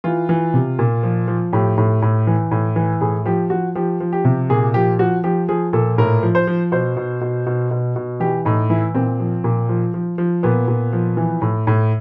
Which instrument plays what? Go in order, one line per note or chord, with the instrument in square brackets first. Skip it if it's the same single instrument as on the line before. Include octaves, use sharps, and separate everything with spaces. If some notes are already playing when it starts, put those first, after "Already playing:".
[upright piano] E3 F4
E3
C3
A#2
F3
F3
A2 G4
A2
A2
E3
A2
E3
A2 G#4
F3 G4
F3 F#4
F3 G4
F3
G4
C3
A#2 G#4
F3 G4
F3 F#4
F3 G4
F3 G#4
A#2 A4
A2 A#4
F3
C5
F3
B2 C5
B2
B2
B2
B2
B2
E3 G4
A2 D#4
E3 E4
A#2 C4
F3
A#2
F3
F3
F3
A#2 B3
A#2
F3
E3
A2
A2